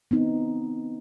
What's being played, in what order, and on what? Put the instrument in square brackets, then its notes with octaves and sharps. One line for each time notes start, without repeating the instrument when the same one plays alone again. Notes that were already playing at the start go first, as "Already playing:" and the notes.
[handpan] B3 C4 D#4